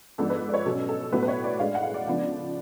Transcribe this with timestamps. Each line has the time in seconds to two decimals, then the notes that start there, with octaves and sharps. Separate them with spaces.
0.18 G#2 F3 B3 D4 A4
0.30 B4
0.49 D5
0.54 C#5
0.65 B2 F#3 C#4 A4
0.89 A4
1.12 A2 F#3 B3 B4
1.23 B4
1.28 C#5
1.44 D5
1.59 A2 G#3 D4 F5
1.75 F#5
1.83 F5
1.94 D5
2.06 C#3 F3 B3 D4